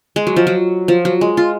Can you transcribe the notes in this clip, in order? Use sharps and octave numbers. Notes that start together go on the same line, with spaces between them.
G#3
F#3
F3
F#3
F3
F#3
G#3
F4